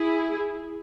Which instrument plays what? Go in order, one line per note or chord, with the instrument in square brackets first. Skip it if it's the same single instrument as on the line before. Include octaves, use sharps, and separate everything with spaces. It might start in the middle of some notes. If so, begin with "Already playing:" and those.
Already playing: [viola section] E4 G#4